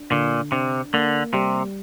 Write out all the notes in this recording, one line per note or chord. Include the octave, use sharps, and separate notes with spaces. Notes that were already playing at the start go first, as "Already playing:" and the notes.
Already playing: D4
A#2 D3
C3 D4
D3 A#3
C3 G3